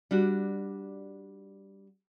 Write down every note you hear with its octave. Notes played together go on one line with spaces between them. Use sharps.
G3 D4 F#4